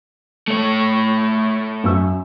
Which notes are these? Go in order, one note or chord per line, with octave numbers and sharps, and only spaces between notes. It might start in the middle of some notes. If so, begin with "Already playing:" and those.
A3 C#5
F#2 E6